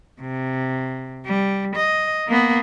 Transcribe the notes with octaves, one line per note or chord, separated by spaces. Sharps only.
C3
G3
D#5
A#3 B3